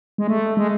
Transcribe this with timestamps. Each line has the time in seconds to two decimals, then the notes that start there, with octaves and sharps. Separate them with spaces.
0.18 G#3
0.27 A3
0.57 G#3